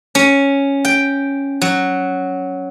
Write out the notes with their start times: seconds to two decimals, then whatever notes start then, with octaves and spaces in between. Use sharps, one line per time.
0.15 C#4
0.85 G5
1.61 F#3